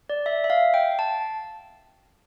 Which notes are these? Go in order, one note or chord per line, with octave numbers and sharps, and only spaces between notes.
D5
E5
E5
F5
G5
A5